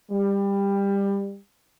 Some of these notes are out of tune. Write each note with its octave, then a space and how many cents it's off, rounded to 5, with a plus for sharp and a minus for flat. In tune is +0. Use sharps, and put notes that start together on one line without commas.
G3 +20